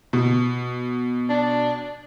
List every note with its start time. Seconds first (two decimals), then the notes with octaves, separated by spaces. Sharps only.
0.13 B2
1.29 D4